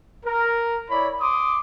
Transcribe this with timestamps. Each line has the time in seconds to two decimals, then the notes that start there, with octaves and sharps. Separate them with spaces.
0.25 A#4
0.89 E4 C#5 D5 B5
1.21 C6 D6 D#6